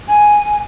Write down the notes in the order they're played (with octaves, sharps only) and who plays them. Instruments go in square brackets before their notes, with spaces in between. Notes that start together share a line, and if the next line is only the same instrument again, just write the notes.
[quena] G#5